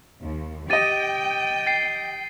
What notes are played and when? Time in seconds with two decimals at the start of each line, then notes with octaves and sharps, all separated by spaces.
0.21 D#2
0.70 G4 D#5 G5 A6 D#7
1.66 A6 C7 D#7